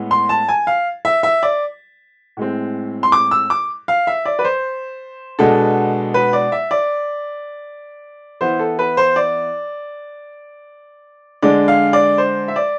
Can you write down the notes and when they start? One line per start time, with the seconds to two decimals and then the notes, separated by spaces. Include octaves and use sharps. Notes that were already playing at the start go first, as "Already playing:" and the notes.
Already playing: A2 G#3 B3
0.11 C6
0.29 A5
0.49 G#5
0.67 F5
1.05 E5
1.23 E5
1.43 D5
2.37 A2 G#3 C4
3.03 C6
3.12 D6
3.31 E6
3.50 D6
3.88 F5
4.07 E5
4.25 D5
4.39 B4
4.44 C5
5.39 B2 G#3 B3 D4 A4
6.14 B4
6.33 D5
6.52 E5
6.71 D5
8.41 E3 B3 E4 C5
8.59 A4
8.79 B4
8.97 C5
9.16 D5
11.42 D3 G#3 D4 D5
11.68 F5
11.93 D5
12.18 C5
12.48 E5
12.56 D5